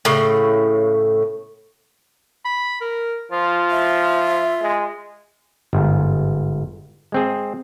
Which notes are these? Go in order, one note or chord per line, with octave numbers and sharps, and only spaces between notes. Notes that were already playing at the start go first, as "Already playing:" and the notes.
A2 C#3
B5
A#4
F3 F4
E5
G#3
G1 G#2
G#3 C4 G#4